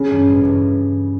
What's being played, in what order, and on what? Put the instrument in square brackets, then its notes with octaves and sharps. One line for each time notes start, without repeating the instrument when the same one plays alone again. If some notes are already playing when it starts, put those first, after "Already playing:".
Already playing: [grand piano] C#3
[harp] G2 E3
A1
G2 E3